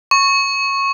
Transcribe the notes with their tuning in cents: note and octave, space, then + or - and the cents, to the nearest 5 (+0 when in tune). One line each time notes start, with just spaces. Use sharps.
C#6 -15